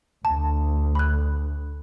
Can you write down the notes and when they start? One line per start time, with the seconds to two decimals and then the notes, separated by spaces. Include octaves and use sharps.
0.25 D2 A5
0.95 B5 F#6